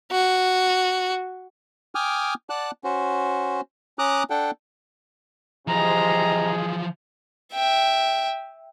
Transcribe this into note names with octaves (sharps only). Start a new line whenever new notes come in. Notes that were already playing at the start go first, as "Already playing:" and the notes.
F#4
G5 G#5 D6 D#6 F6
D5 F#5 A5 F#6
C#4 F#4 C5
C#4 A#5 D6 D#6 F#6
D4 A4 F#5 G5
C3 E3 F3 G#4 D#5 A#5
E5 G5